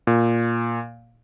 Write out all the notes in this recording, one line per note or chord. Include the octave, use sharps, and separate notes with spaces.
A#2